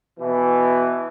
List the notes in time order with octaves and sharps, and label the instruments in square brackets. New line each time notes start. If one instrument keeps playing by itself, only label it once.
[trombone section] B2 E3